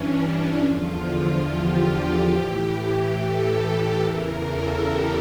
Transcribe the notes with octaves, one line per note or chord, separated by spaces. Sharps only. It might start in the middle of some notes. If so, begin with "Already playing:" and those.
Already playing: G2 E3 C#4 D4
E2 D3 F3 F4
G4
A2 E3 G4
A4
E2 C#3 E3 A#4
A4
G4